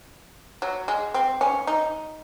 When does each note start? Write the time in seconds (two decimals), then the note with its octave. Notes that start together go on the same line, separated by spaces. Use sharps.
0.62 F#3
0.88 G#3
1.14 C4
1.41 C#4
1.67 D#4